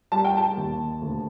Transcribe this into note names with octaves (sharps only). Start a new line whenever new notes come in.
G3 A5
G5
A5
D#2
D2